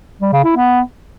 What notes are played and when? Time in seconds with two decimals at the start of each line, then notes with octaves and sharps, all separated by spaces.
0.21 G3
0.33 C#3
0.45 E4
0.56 B3